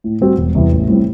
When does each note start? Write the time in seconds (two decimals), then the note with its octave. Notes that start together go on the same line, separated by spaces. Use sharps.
0.04 A2
0.21 G3 C4 F#4
0.37 E1
0.55 E2 C3 E3 G3
0.72 A1
0.88 A2 G3 C4